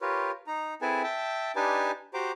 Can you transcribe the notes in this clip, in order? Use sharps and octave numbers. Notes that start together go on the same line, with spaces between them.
F4 G4 A#4 B4 C#5
D#4 A#5
C4 E4 G#4 A4 B4 G#5
E5 G5 A5
D4 D#4 G4 B4 G#5 A5
F#4 G4 C5 A#5 D6